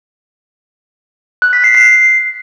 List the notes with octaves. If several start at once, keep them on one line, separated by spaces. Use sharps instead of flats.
F#6
B6
C7
C7